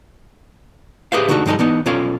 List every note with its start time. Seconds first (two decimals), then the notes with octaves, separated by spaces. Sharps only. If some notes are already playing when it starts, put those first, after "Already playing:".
1.12 G4 G#4 B4 C5 E5 F5
1.28 D3 A3 D#4 F#4 A4
1.46 G2 F3 G#3 D#4 G#4 A4
1.59 E3 B3 D#4
1.86 B1 C#4 F4 A4 C#5 F5